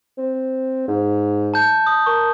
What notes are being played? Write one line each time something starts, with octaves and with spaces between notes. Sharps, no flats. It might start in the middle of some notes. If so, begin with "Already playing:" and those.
C4
G#2
A5 G6
D#6
A#4 C#6